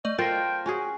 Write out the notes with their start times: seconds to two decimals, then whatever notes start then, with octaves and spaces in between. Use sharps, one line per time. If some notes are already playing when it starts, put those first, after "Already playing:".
0.05 A3 D5 D#5
0.18 F4 A4 A#4 C5 G5 A#6
0.66 C#4 F#4 G#4